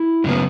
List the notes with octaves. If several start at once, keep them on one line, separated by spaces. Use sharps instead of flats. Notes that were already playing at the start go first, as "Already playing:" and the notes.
Already playing: E4
F#2 C#3 F#3 B3